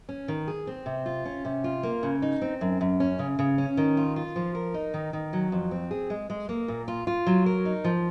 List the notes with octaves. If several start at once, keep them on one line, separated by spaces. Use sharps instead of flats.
C#4
D#3
G#4
C4
C3
F4
C#4
C3
F4
A#3
C#3
D#4
C4
F#2
F#2
C#4
C#3
C#3
C#4
D#3
F4
F4
F3
A#4
D#4
D#3
D#3
F#3
F2
C4
G#4
G#3
G#3
A#3
A#2
F4
F4
F#3
A#4
D#4
F3